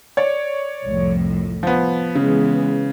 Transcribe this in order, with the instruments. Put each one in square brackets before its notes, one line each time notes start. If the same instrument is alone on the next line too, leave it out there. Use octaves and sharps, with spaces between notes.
[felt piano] C#5 D5
[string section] C2 F2 A2
[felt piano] F3 B3
[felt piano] C#3 [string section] E3 G#3 B3